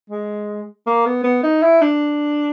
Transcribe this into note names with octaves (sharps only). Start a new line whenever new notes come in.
G#3
A#3
B3
B3
D#4
E4
D4